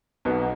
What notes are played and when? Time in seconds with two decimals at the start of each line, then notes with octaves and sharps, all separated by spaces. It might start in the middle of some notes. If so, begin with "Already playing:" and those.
0.25 B1 B2 B3